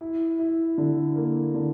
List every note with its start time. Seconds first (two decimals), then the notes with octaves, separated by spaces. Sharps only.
0.01 E4
0.39 E4
0.78 D3
1.16 A#3
1.54 D3